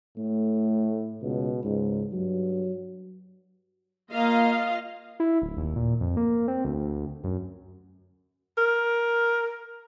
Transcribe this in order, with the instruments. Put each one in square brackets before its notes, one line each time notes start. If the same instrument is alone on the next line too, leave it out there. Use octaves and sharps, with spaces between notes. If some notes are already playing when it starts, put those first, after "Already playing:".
[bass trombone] A2 [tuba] A3
[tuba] C#2 [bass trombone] B2
[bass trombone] C#2 [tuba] G#2
[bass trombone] G2 [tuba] F#3
[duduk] A#3 [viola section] F4 D#5 F5
[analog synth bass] E4
D1
D#2
A#2
F2
A#3
C4
D2
F#2
[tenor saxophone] A#4